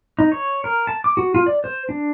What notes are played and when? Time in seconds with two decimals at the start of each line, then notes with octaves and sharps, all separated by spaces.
0.19 D#4
0.32 C#5
0.64 A#4
0.87 A5
1.04 D6
1.17 F#4
1.35 F4
1.46 D5
1.64 C5
1.89 D4